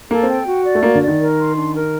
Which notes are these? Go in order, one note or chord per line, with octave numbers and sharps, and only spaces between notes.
A#3 A4
C4
G5
F#4
D5
A3
A#3 F#4
D3
D5
D#3
A#4
C6
D4
A#4